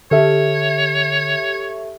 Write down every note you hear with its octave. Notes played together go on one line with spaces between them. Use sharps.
D3 G4 A4 C#5 E5